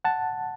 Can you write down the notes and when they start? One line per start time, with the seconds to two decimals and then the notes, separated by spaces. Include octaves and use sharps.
0.05 F#5 A5